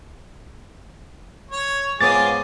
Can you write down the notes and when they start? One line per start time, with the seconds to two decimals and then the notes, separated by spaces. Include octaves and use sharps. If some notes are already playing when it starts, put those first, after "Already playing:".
1.51 C#5
2.01 G#2 B3 F4 G#4 C#5 D6 A6